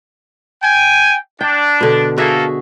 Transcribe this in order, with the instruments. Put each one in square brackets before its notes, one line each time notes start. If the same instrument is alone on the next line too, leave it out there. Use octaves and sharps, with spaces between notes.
[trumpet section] G5 G#5
[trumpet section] D4 [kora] G5
[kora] B2 D3
[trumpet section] A#3 A4 [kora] F#4 G#4 E5